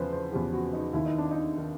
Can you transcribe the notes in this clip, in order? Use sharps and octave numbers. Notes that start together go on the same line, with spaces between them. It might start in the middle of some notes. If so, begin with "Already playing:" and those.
Already playing: E2 C#3 F3 B4 C5
C5
E2 C#3 F3 G4
F#4
D#4
D#2 D#3 E4
D#4
D4
D#4
D#3